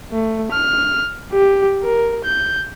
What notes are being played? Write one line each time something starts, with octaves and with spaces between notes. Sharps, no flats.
A3
F6
G4
A#4
G6